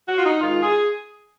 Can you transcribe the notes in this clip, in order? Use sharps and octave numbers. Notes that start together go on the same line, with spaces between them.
F#4
F4
D#4
G#2 D#3 G#3 F4
G#4